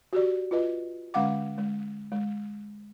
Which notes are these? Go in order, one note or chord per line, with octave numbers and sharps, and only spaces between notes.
F#4 G4 D5
F4 B4 D#5
D3 G#3 C#4 F5 F#5 D6
G#3
G#3